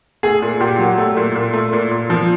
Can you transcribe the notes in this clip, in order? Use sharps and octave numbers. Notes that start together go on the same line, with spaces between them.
A3 G#4
A#2
A#2 G4
F#3
A3
A#2
A#2
A3
A#2
A#2
F3